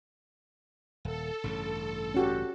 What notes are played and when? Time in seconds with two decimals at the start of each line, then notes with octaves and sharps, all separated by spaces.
1.05 D#1 A4
1.44 A1 G2 C#3
2.14 C#4 F#4 G4